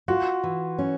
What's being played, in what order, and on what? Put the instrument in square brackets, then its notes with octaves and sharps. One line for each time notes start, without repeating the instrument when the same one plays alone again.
[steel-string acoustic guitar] F4 [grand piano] F#4
[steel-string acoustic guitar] E3
C#4